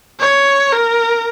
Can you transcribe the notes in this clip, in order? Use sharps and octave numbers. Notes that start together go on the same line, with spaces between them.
C#5
A#4